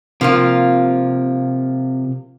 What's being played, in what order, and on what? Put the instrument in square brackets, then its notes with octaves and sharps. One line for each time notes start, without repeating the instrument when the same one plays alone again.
[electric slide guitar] C3 [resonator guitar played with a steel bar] F3 A#3 F4